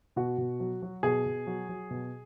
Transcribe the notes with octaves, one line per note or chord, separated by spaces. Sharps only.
B2 F#4
B2
F#3
F#3
B2 G#4
B2
F#3
F#3
B2